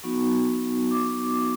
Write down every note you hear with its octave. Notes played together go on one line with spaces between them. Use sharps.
F#3 B3 D#4 F#4 C#6
D6